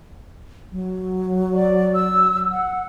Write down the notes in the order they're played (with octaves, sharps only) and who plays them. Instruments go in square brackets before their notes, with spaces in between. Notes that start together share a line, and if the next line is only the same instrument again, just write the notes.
[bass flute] F#3
[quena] D5
E6
F#5